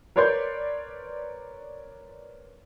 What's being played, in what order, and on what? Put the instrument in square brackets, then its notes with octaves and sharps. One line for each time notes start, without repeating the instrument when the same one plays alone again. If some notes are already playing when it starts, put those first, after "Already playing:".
[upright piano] A#4 B4 C#5 D5 C6 G6